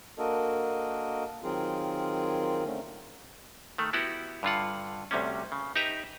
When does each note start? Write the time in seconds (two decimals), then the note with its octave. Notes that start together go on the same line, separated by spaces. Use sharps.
0.18 A#3 D4 F#4 A4 A#4 D#5
1.43 D#3 F#3 C4 F4 G#4 A#4
2.64 D3 A3 C4 C#4
3.78 D#3 A3
3.93 B3 E4 F#4 G4 F#5
4.43 G2 D3 F4 F#5
5.11 D2 C3 G3 C#4
5.52 C#3
5.76 D#4 G4 B4 E5 A#5